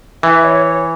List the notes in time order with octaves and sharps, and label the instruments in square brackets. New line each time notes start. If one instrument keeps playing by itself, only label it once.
[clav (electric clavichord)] E3 [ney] E5
[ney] C#5
C#5